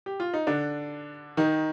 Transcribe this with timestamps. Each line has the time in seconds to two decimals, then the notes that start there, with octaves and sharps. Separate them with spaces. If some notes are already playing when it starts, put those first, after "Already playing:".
0.06 G4
0.20 F4
0.34 D#4
0.47 D3 D4
1.37 D#3 D#4